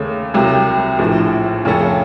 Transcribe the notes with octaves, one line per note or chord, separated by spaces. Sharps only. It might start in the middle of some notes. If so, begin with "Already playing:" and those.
Already playing: D#2 C#3 A3
C2 C3 F#3
A#1 A2 F3
F2 C#3 A3 C#4 A4